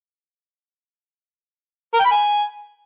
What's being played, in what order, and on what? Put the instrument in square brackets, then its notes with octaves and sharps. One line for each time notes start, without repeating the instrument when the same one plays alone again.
[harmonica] A#4
G5
B5
G#5